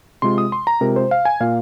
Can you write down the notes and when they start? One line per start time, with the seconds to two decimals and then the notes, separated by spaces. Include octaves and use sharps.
0.22 C3 G#3 F4 C6
0.38 D#6
0.52 C6
0.67 A#5
0.81 C3 G#3 F4 A#4
0.96 C5
1.11 F5
1.25 G#5
1.40 A#2 A#3 F4 F5